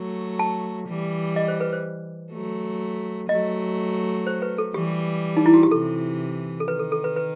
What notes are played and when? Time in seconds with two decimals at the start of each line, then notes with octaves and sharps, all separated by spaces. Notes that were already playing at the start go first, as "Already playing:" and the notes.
Already playing: F#3 A3
0.39 A5
0.88 E3 G3
1.36 D#5
1.48 C5
1.60 B4
1.73 C5
2.33 F#3 A3
3.29 F#3 A3 D#5
4.27 C5
4.42 B4
4.58 A4
4.74 E3 G3 G4
5.37 D#4
5.46 E4
5.54 F#4
5.63 G4
5.71 C3 E3 A4
6.60 A4
6.68 D#3 B4
6.79 A4
6.92 A4
7.04 B4
7.16 B4